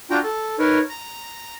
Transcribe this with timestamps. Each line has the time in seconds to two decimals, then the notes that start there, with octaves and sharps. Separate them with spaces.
0.11 D4 F4 F#4 G5 A#5
0.23 A4
0.59 D#4 A#4 B4 C#5
0.89 A#5